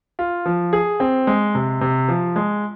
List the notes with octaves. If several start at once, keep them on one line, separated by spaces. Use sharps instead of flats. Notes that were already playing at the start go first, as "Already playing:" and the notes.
F4
F3
G#4
C4
G#3
C3
C3
F3
G#3